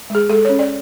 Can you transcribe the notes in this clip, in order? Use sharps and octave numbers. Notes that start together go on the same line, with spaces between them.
G#3 G#4
G#3 A4
C#4 C#5
D5